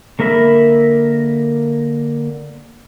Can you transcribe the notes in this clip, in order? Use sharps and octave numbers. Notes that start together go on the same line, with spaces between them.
D3 A#3 A#4 E5 B5